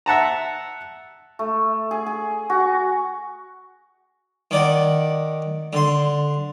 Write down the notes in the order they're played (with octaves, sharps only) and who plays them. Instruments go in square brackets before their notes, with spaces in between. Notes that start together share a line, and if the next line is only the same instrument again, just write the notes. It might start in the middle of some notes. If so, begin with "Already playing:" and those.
[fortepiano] E5 F#5 A5 A#5
[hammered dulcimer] A3
G#4
G#4
F#4
[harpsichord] D#3 D5 F#5
D3 C6